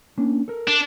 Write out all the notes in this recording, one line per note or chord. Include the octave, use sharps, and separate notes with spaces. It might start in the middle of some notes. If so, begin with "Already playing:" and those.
A#3 C#4 D4
A4 A#4
D4